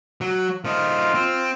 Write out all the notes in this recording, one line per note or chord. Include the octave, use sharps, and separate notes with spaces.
F#3
F3 D#4 F4
C4